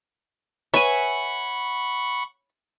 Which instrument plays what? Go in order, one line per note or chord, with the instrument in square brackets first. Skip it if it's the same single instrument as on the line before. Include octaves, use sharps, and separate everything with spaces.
[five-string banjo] B4 C#5 [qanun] E5 G#5 [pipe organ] F#5 B5 C#6